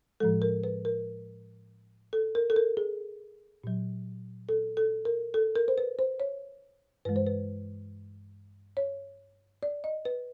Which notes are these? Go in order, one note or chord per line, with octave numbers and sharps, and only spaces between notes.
A2 F3 G#3 A4
A#4
B4
A#4
A4
A#4
A4
A#4
G#4
A#2 F#3
A4
A4
A#4
A4
A#4
C5
B4
C5
C#5
G2 E3 G#3 B4
C5
B4
C#5
D5
D#5
B4